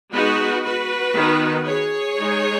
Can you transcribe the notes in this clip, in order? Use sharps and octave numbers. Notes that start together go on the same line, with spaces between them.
G#3 B3 D#4 F#4 B4
F#4 B4
D#3 B3 D#4
G#4 C#5
G#3 D#4